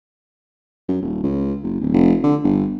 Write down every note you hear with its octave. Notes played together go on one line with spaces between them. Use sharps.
F#2
D#1
C#2
F#1
D1
F1
D3
G1